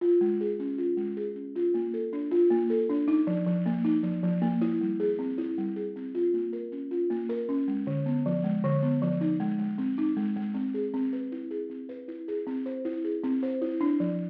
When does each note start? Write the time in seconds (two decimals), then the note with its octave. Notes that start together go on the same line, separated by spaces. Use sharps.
0.01 F4
0.21 G#3
0.41 G#4
0.60 C#4
0.78 F4
0.97 G#3
1.17 G#4
1.36 C#4
1.56 F4
1.74 A#3
1.94 A4
2.13 D4
2.31 F4
2.50 A#3
2.70 A4
2.90 D4
3.08 D#4
3.27 F3
3.47 F3
3.66 A#3
3.84 D#4
4.04 F3
4.23 F3
4.42 A#3
4.61 E4
4.81 G3
5.00 G#4
5.19 C4
5.38 E4
5.58 G3
5.76 G#4
5.96 C4
6.15 F4
6.34 A#3
6.53 A#4
6.72 C#4
6.91 F4
7.10 A#3
7.29 A#4
7.49 C#4
7.68 G#3
7.87 D3
8.06 B3
8.26 F3
8.44 G#3
8.64 D3
8.83 B3
9.02 F3
9.21 D#4
9.40 G#3
9.59 G#3
9.78 C4
9.98 D#4
10.17 G#3
10.36 G#3
10.55 C4
10.74 G#4
10.94 C4
11.13 B4
11.32 E4
11.51 G#4
11.70 C4
11.89 B4
12.08 E4
12.28 G#4
12.47 C4
12.66 C5
12.85 E4
13.04 G#4
13.24 C4
13.43 C5
13.62 E4
13.81 D4
14.00 F3